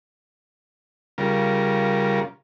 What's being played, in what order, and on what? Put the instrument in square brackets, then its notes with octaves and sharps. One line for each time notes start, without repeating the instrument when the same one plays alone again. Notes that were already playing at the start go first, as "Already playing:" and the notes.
[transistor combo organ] C#3 G3 F4 A#4